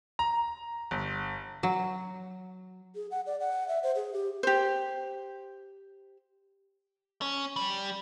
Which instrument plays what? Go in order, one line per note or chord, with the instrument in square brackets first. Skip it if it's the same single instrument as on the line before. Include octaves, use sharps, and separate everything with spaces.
[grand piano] A#5
G1
[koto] F#3
[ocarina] G#4
F#5
D5
F#5
E5
C5
G#4
G4
[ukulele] G4 C5
[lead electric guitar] C#4
G3